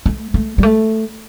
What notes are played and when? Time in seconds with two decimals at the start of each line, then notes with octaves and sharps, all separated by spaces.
0.06 A3
0.34 A3
0.58 G3
0.63 A3